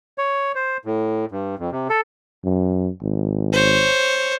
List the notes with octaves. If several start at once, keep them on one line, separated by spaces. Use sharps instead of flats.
C#5
C5
A2
G2
F2
C3
A4
F#2
G#1
C5 C#5